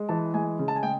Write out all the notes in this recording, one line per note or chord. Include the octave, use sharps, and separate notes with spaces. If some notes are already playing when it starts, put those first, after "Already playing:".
Already playing: G#3
E3 A5
G#3 G#5
C#3
A5
G#5
G#3 G5